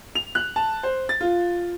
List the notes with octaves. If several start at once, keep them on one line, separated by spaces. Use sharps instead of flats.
F7
F#6
A5
C5
A6
F4